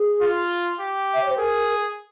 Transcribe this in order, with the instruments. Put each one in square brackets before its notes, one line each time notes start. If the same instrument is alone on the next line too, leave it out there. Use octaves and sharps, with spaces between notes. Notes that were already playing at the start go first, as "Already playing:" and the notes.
Already playing: [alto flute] G#4
[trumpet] F4
G4
[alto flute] E5
C#5
C5
[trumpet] G#4 [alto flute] A#4